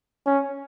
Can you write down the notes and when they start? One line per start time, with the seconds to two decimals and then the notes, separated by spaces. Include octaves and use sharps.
0.27 C#4